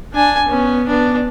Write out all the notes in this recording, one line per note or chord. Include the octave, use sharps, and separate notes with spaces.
D4 G#5
B3 C#4
B3 D4